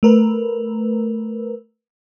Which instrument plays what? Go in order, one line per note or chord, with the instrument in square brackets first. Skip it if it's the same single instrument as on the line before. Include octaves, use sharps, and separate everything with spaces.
[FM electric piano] A3 A#4 B4